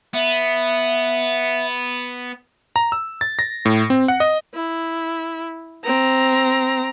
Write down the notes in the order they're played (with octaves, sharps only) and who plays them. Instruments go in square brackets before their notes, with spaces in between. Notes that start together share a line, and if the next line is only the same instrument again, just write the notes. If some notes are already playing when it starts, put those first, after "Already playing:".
[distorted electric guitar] B3 [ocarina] E5
[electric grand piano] A#5
E6
A6
A#6
A2
C4
F#5
D#5
[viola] E4
C4 A#5